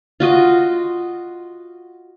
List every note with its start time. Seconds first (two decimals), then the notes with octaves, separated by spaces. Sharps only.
0.20 F4 F#4 D#5